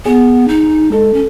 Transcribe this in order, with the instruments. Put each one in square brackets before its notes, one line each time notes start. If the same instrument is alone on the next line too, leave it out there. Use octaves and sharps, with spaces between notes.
[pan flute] B3 [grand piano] G#4
[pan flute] D#4
[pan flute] G#3 [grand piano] A4
[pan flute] C#4